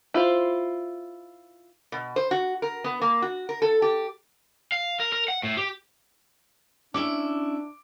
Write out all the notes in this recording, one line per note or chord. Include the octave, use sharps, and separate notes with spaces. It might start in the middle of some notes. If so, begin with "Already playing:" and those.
E4 F4 C5
B2
C5
F#4
A#4
B3
A#3
F#4
A#4
A4
G4
F5
A#4
A#4
F#5
A2
G4
C#4 D4 E4 E5 D6